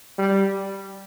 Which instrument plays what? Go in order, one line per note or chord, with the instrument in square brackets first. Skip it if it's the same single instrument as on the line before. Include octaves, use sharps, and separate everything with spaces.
[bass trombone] G3